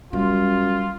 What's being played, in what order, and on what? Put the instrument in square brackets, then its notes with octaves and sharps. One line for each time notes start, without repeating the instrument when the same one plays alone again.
[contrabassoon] F#2 [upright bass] G3 [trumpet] F4